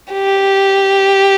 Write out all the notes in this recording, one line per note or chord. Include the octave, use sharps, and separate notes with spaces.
G4